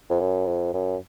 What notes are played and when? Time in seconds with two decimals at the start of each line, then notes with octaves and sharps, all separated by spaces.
0.10 F2
0.20 F#2
0.46 F2
0.74 F#2